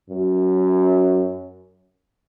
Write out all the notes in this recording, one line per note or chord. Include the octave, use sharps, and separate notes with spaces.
F#2